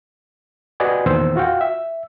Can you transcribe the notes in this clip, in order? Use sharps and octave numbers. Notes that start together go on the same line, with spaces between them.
F#4 G4 B4 D5 D#5 G#5
E2 A#2 D#3 C5 E6
F4 F#4 F5 G5
E5